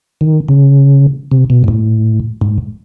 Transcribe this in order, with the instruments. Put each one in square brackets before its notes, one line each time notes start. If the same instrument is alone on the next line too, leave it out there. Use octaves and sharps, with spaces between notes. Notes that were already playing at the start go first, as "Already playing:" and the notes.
[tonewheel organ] D#3
C#3
C3
B2
G#2
A2
G#2